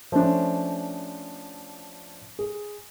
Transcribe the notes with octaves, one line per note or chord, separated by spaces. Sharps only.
F3 A3 C#4 D4
G#4